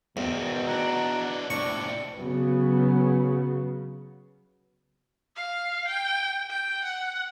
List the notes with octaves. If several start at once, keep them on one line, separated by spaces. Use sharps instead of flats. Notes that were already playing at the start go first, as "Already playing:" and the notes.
E2 B2 D#3 C4
D4 E4 F#5 A#5
A2 C3 D4 C#6
C#3 F#3 B3
F5
G5
G5
F#5